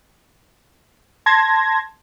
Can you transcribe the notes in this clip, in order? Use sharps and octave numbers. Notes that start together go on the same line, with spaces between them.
A5 C6 G#6 A#6